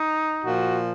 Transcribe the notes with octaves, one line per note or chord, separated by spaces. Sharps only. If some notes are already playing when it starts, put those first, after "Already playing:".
Already playing: D#4
A#2 F3 F#4